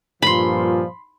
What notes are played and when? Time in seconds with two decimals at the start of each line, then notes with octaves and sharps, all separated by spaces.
0.22 G2 A#2 F3 B5 C6